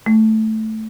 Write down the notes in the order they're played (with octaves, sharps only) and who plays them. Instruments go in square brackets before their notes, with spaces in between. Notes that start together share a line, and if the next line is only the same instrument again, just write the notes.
[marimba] A3